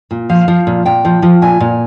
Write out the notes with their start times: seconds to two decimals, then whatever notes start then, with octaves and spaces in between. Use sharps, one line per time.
0.11 A#2
0.29 F3 F5
0.48 F3
0.67 A#2
0.85 A#2 G5
1.05 F3
1.22 F3
1.42 A#2 G#5
1.60 A#2